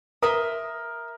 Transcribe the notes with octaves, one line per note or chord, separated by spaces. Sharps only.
A#4 E5 C6 D#6